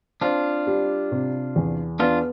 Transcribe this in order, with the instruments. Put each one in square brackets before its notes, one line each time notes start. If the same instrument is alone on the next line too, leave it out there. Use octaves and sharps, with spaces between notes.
[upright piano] C4 [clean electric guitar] D4 F4
[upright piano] G3
C3
E2
[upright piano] B3 [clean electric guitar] D4 F4